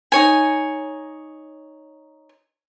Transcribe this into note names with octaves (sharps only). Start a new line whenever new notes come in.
D#4 C#5 G#5